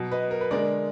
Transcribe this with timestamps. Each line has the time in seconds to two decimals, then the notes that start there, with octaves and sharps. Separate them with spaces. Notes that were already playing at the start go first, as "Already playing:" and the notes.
Already playing: B2 F#3
0.11 B4 D#5
0.31 A#4
0.41 B4
0.51 D3 G#3 A#4 D5